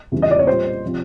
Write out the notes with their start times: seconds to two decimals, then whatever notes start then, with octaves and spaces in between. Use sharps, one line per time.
0.12 E2 C#3 E3 G3
0.22 D#5
0.31 D5
0.39 C#5
0.47 A#2 G3 C5
0.85 C3 F3